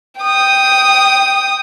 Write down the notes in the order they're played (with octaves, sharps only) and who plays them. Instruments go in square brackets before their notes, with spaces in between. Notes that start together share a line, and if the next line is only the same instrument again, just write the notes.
[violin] G5 D#6